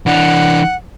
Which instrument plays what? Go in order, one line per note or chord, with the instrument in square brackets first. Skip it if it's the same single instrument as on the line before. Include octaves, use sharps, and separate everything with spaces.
[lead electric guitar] E3 D4 [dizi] F#5